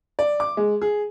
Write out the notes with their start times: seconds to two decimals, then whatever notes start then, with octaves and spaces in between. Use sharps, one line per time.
0.19 D5
0.40 D6
0.57 G#3
0.82 G#4